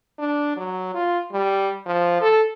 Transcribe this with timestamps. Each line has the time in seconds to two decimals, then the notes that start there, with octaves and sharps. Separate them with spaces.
0.19 D4
0.57 F#3
0.95 F4
1.32 G3
1.86 F3
2.21 A4